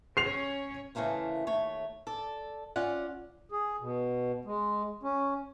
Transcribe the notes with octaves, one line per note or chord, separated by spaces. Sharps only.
C#4 C#5 C7 F7
C#3 E3 A3 A#3 C4
D#2 A3 C#5
A4 D5
C#4 F4 D5 F#5
G#4
B2
G#3
C#4